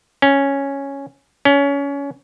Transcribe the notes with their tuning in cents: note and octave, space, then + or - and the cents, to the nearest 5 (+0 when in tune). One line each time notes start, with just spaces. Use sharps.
C#4 +0
C#4 +25